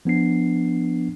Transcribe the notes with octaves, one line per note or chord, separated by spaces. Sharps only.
F3 B3 D4 C7